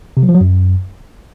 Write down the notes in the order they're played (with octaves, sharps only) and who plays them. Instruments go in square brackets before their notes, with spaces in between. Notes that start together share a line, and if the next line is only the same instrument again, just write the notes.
[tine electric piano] C3
F#3
F3
F#3
F#2